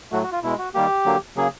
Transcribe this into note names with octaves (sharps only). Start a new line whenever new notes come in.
A2 F#3 A3 F#4
F#4
F4
B2 G#3 E4
F#4
D#3 G3 A#3 G4
D3 F#3 A#3
C#3 F#3 A#3 G#4